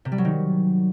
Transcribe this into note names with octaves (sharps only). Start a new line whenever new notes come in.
C3
G3
F#3
D#3